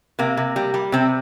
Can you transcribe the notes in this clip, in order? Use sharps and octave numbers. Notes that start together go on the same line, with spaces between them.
C3 A#3
C3
G3
G3
C3 C4